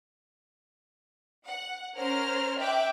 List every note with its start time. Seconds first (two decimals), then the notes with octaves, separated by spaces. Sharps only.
1.47 F#5
1.96 C#4 A#4 C5 F6
2.60 E5 G5 D6 F#6